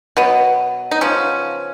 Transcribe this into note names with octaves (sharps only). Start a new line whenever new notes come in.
B2 F#3 B3
D#4
C#3 F3 B3 C#4